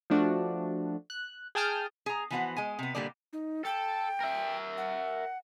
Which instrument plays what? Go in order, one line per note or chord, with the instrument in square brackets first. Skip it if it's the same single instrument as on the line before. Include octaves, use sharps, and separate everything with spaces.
[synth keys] F3 A3 D4 F#4
F#6
G#4 G5 A5 D#6 F6 G6
[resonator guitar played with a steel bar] G#4 A#5
E3 F3 B3 F#4 C5 F#5
G#3 G#5
C3 B3
A#2 D3 G3 G#3 A#3 D5
[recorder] D#4
[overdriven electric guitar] A4 [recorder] G5
[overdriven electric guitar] A#4 E5
[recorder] F#5